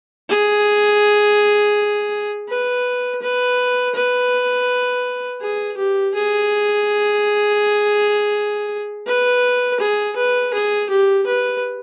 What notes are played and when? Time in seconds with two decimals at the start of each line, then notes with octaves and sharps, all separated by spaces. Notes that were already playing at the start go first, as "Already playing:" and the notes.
0.29 G#4
2.49 B4
3.22 B4
3.95 B4
5.41 G#4
5.77 G4
6.15 G#4
9.07 B4
9.80 G#4
10.16 B4
10.54 G#4
10.90 G4
11.26 B4